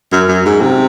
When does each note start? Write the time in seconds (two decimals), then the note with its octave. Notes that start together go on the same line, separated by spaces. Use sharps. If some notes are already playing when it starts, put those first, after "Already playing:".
0.12 F#2
0.28 F#2
0.45 G#2
0.62 C3